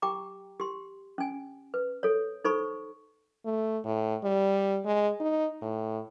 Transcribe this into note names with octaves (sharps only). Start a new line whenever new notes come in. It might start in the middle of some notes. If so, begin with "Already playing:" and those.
G4 G5 A#5 D6
G4 C6
C#4 G#5
B4
A4 C#5
D#4 A4 C5 B5 C#6
A3
A2
G3
G#3
D#4
A2